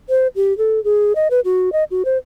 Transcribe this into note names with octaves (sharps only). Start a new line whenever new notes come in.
C5
G4
A4
G#4
D#5
B4
F#4
D#5
F#4
C5